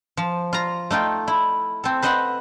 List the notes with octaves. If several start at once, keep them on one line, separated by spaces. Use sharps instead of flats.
F3
F4 A#5
A3 D#4 F4 G5
E4
C4 A4
B4 C5 D#5 E5 F#5